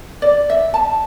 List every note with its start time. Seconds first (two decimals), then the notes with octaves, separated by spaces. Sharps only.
0.22 D5
0.50 E5
0.74 A5